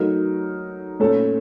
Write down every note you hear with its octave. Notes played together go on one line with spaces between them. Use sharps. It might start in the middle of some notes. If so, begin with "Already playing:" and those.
Already playing: F#3 A3 D#4 A#4
A#2 A3 C#4 A4